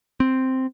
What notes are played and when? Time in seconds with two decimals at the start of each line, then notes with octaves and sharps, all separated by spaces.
0.20 C4